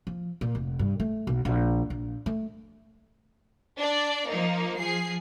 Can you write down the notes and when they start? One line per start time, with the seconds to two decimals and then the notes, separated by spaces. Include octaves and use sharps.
0.07 F3
0.41 A#2
0.55 F1
0.79 G2
1.00 A3
1.27 B1
1.45 A#1
1.90 A#1
2.26 A3
3.79 D4 D5
4.29 F3 A#3 D#4
4.80 F3 G#4 C7